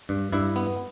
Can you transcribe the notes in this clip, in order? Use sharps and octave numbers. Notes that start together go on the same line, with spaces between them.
G2
G2 E4
B3